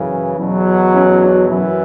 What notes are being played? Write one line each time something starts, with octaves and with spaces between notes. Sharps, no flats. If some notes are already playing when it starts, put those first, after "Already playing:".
Already playing: F#2 C#3 E3
E2 B2 F#3
C#4 E4
D4 F#4
F#2 E3 C#4 E4